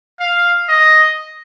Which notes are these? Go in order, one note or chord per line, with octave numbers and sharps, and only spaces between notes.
F5
D#5